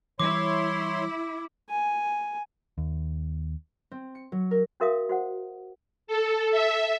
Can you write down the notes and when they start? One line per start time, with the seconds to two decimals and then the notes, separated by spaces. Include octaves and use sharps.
0.20 E3 G3 E4 C#5 C6 D6
1.69 G#5
2.78 D#2
3.91 C4
4.15 C#7
4.32 F#3
4.51 A#4
4.80 C#4 F#4 A#4 E5 F5 D#6
5.09 F#4 C5 F#5
6.07 A4
6.52 E5